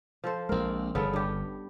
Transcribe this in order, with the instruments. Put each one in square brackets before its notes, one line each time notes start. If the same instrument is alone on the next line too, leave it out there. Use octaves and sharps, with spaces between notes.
[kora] F3 A4 C5
[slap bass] A#1 G#3 [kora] C4 A#4
[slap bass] G1 [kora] C#3 B3 A4
[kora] G2 G4